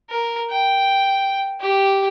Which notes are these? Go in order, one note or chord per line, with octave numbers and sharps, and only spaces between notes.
A#4
G5
G4